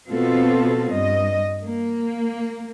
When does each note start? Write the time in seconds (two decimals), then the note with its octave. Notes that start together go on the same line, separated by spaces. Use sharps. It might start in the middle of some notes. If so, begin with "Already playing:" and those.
0.10 B2 B3 C4 F4 A4
0.93 G2 D#5
1.64 A#3